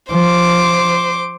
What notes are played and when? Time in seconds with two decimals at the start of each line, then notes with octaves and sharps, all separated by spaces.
0.11 F3 C5 D6